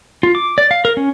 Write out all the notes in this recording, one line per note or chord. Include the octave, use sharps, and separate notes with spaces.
F4
D6
D5
F5
A#4
C#4